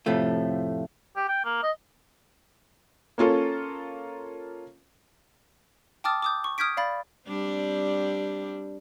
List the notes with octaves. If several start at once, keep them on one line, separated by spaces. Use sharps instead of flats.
F2 A2 C3 A3 F4
G4
G5
A#3
D#5
A#3 C#4 F4 A4
G5 A5 D6 D#6 F6 A6
D6 D#6 G6
C#6
D#6 F6 G6 G#6 B6 D7
D5 F5 B5 A6
G3 C4 D4